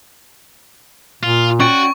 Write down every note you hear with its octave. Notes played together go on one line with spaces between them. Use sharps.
A#2 F4
C#4 F#4 D5 G5 C#6